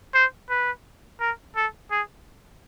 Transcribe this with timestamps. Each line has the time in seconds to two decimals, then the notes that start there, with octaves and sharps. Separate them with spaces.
0.15 C5
0.50 B4
1.20 A#4
1.56 A4
1.91 G#4